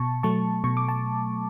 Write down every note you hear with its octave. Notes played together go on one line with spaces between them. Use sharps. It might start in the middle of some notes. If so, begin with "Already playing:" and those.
Already playing: B2 A5 C#6
F#3 A3 A5 C#6
B2 C#6
D6
A5